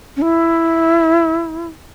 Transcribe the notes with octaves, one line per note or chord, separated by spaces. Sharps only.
C#4
E4